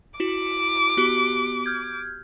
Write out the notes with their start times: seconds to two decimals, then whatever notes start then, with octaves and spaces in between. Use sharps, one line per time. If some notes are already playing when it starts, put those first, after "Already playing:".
0.20 E4 F#4 D6
0.97 B3 F#4 G4
1.66 F6 G6 G#6